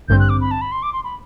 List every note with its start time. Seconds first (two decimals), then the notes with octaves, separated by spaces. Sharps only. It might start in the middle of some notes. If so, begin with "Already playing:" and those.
0.08 A1 G2 D3 G3 C4 G6
0.20 F#6
0.29 D6
0.41 B5
0.51 A5
0.61 B5
0.72 C6
0.83 D6
0.93 C6
1.04 B5